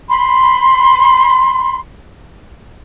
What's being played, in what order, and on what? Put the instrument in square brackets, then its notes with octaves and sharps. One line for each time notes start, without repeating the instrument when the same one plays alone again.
[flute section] B5 C6